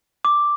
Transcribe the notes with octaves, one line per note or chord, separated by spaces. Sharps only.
D6